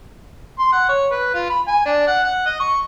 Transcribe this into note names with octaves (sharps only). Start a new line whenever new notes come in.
C6
F#5
C#5
B4
F4
B5
G#5
D4
F#5
F#5
D#5
C#6